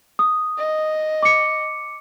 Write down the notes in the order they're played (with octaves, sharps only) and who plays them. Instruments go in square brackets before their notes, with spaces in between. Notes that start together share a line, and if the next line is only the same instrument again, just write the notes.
[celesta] D#6
[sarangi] D#5
[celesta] D6 C#7